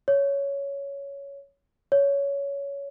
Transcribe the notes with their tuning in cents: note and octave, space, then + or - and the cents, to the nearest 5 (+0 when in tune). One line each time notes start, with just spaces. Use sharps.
C#5 +10
C#5 +15